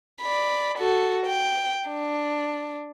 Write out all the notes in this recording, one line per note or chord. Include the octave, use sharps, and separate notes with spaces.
D5 B5
F#4 A4
G5
D4